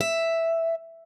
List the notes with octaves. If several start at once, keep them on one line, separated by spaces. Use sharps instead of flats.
E5